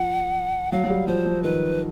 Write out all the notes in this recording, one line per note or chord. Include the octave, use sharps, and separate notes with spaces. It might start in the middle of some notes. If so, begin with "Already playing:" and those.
Already playing: F3 F#5
F#3 F5
F#3
G3
F3 C5
F3
D#3 B4